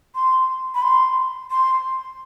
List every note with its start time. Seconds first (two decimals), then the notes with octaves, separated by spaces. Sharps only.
0.15 C6
0.75 B5
0.82 C6
1.50 C6